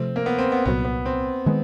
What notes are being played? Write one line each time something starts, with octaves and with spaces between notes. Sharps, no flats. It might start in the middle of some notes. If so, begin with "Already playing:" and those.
Already playing: C3 F3 A3 C4
A#3
B3
C4
B3
C2 A#2 F#3 B3
B3
C4
D#3 G#3 B3